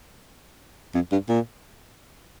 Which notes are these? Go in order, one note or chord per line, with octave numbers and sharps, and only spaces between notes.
F2
G2
A#2